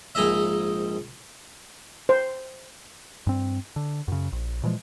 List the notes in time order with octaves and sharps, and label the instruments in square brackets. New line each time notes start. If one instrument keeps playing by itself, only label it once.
[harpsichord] A#1 G#2 D#4 G#4 D#5 E5
[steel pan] C5
[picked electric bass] G2 C4
D3
F#2 C#3
A#1
A#2 E3 F3 G#3